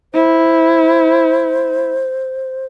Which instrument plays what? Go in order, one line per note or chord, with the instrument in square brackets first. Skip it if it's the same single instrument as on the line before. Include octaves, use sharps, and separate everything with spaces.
[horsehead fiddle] E4 [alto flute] C5